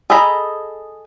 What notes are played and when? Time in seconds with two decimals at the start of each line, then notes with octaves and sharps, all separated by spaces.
0.10 G#4 A4 D#5 A#5 B5